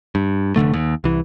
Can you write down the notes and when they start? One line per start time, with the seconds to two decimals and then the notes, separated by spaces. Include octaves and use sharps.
0.15 G2
0.56 F1 D#2 D3 A3
0.74 D#2
1.04 C2 E3